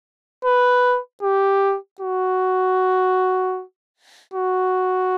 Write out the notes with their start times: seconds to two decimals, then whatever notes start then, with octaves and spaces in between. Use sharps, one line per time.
0.45 B4
1.23 G4
2.00 F#4
4.34 F#4